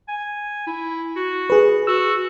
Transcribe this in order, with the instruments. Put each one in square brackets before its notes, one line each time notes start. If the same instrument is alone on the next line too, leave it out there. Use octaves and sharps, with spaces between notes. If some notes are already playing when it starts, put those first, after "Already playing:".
[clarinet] G#5
E4
F#4
[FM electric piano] G#4 B4
[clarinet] F#4 [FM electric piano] E6